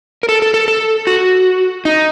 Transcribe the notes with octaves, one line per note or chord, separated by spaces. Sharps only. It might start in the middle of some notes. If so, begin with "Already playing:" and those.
A#4
A4
A4
A4
A4
F#4
D#4